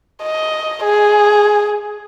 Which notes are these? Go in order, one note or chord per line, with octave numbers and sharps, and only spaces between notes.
D#5
G#4